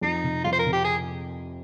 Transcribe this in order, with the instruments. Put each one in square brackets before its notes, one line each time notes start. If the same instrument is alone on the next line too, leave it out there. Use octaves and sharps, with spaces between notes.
[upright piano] F2 [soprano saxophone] D#4
[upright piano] C3
[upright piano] F2 [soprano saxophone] F4
[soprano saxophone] C5
A#4
[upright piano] C3
[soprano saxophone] G4
G#4